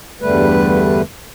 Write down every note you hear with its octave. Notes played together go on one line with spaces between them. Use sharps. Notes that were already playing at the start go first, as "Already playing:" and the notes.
E2 G2 D3 G3 A3 B4